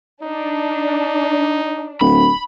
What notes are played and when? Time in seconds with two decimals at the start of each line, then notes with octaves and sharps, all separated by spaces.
0.23 D4 D#4
2.01 D1 B5